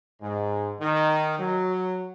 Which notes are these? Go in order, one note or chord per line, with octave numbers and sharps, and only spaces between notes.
G#2
D#3
F#3